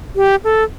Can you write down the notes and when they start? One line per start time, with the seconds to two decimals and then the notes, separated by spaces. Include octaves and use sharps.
0.16 G4
0.44 A4